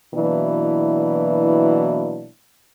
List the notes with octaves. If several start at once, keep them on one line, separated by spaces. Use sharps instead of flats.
B2 E3 F#3 A#3 D4 E4